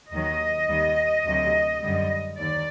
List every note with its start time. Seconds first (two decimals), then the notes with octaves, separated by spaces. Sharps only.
0.11 D#2 D#3 F#3 D#5
0.68 D#2 D#3 G3
1.25 D2 C3 F#3
1.82 F#2 D3 G3
2.39 D#2 D5